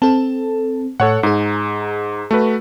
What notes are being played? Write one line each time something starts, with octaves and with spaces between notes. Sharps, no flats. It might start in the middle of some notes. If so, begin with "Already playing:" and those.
C4 A4 A5
A2 A4 C#5 F#5
G#2 G#4 A#5
A3 F#4 B4